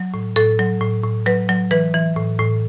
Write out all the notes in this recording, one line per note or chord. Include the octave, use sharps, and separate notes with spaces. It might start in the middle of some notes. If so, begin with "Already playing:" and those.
Already playing: F#3
A2
A2 A4
F#3
A2
A2
F#3 B4
F#3
E3 B4
E3
A2
A2